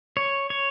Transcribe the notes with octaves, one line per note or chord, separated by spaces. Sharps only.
C#5
C#5